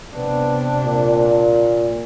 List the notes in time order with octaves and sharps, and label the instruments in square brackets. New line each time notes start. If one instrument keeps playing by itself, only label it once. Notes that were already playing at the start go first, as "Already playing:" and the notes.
[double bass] C3 D4 [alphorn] B3
[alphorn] A#2